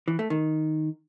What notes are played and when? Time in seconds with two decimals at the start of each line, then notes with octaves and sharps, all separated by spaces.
0.08 E3
0.19 A3
0.30 D#3